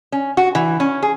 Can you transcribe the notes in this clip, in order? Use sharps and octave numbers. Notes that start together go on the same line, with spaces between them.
C#4
F#4
E3
C#4
G#4